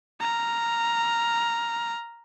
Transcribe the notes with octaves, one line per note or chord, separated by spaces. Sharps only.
A#5 F6